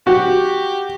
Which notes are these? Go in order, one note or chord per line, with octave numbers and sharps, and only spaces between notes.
F#4 G4